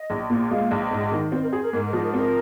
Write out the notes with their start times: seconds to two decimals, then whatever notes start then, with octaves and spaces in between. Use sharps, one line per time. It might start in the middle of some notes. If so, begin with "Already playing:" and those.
Already playing: D#5
0.10 A#1
0.30 A#2
0.50 G#3 F5
0.71 A#1
0.82 C5
0.91 G#2 D#5
1.12 D#3
1.32 C4 C5
1.43 A#4
1.48 D#5
1.52 G#4 C5
1.62 A#4
1.73 G#2 A#4
1.83 A#4
1.93 F3 D#5
2.03 A#4
2.14 C4 A#4